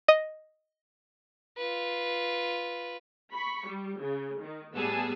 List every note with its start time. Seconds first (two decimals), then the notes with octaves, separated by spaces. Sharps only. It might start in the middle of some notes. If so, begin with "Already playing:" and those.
0.08 D#5
1.57 F4 B4
3.34 B5 C#6 B6
3.67 G3
3.99 C#3
4.43 D#3
4.75 A2 G3 B3 G#4 A5 E6